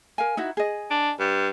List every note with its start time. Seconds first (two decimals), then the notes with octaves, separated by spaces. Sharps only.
0.18 A#4 F5 G#5
0.37 D#4 E4 F#4
0.57 G#4 D#5
0.91 D4
1.20 G2